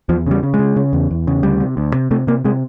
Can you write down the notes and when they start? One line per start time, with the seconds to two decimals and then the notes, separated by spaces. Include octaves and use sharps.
0.09 E2 F3
0.27 C#3 G3
0.43 C#3
0.54 G#3
0.59 C#3
0.76 C#3
0.93 E2
1.11 E2
1.27 C#3
1.43 D2 G3
1.61 C3
1.77 D2
1.94 C3
2.11 C3 A3
2.27 C3 A#3
2.45 C3 G#3